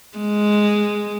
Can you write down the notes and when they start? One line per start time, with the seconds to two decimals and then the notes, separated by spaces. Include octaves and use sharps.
0.18 G#3